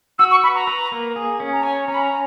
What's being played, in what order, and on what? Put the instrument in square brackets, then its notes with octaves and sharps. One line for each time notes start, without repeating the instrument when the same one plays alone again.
[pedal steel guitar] F#4 [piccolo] E6
[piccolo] C#6
[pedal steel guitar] B4 [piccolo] B5
[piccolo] A#5
[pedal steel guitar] B4
A#3
G#4
C#4
[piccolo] A#5
[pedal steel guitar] C#5 [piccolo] G#5
[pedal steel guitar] C#4 [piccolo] A#5
[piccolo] B5
A#5